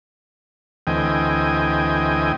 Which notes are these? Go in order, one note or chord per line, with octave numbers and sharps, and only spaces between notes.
D2 E3 C4 D#5 G5 G#5